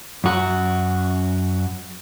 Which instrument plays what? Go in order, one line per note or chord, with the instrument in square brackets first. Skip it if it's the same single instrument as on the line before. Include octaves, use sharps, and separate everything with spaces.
[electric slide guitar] F#2 F#4